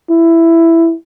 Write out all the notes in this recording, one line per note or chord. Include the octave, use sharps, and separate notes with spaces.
E4